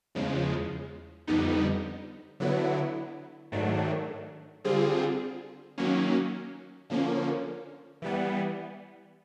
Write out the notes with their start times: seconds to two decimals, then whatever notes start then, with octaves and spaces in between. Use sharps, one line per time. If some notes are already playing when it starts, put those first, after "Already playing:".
0.15 E2 C#3 F3 G#3
1.27 F2 D3 G3 B3 D#4
2.40 D3 F#3 B3 E4
3.52 G#2 D#3 F#3 A3 D4
4.64 D3 G3 C4 F4 G#4
5.78 D#3 F#3 A#3 C#4
6.90 D3 F3 A#3 C#4
8.02 E3 G3 B3